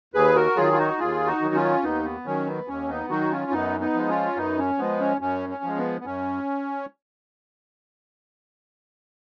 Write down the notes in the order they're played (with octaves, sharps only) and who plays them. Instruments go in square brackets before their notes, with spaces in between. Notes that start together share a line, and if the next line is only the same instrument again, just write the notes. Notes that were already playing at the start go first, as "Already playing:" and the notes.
[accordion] D#2 G#4 B4
F#4 A#4
D#3 F#3 F4 G#4
F4
D#4 F#4
D#2 F4 G#4
D#4 F#4
D#3 F#3
C#4 F4
D#2 B3 D#4
B3
D#3 F#3 C#4
B3
D#2 C#4
B3 D#4
D#3 F#3 D#4 F#4
C#4 F4
F#2 B3 D#4
B3 D#4
F3 G#3
C#4 F4
F#2 B3 D#4
C#4
F3 G#3 B3
C#4
F#2 C#4
C#4
F3 G#3
B3
B3
F#2 C#4